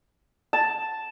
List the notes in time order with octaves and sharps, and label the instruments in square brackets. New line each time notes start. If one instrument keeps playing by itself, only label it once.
[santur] A5